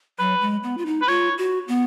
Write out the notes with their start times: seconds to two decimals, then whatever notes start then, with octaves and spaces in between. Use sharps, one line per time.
0.19 F#3 B4
0.41 G#3
0.63 B3
0.78 F4
0.86 D#4
1.02 B4
1.07 F4 C#5
1.38 F#4
1.68 B3